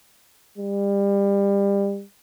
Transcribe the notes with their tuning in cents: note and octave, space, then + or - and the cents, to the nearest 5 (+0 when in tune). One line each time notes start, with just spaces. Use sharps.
G3 +30